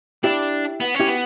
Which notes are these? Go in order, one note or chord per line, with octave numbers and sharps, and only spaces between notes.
D4 E4 G4
B3
C#4
E4 G4
B3